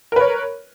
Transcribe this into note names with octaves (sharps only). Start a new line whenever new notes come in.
A#4 B4 C#5